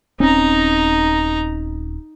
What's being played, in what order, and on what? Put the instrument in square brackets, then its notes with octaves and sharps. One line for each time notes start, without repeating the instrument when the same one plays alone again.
[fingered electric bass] D#1 C4 C#4 [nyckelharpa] D#4 A#5